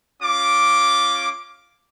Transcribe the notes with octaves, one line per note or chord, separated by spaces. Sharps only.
C#4 F4 D6